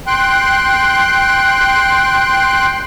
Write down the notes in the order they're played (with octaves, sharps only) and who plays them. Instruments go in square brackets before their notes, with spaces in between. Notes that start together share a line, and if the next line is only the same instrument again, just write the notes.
[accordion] G5 C6 F#6